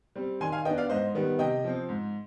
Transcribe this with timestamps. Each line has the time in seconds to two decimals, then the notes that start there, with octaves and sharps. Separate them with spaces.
0.15 G3 C4
0.41 D#3 G#5 C6
0.52 F5 G#5
0.65 B3 D4 D#5 G5
0.78 D5 F5
0.90 G#2 C5 D#5
1.15 D#3 G3 B3
1.39 C3 D#5 G5
1.64 F3 C4
1.89 G#2